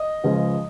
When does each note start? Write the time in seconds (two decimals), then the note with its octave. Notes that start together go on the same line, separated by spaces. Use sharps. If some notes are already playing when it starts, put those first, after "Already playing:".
Already playing: D#5
0.24 C#2 C#3 F3 G#3